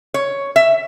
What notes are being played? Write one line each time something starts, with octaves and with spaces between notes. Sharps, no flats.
C#5
E5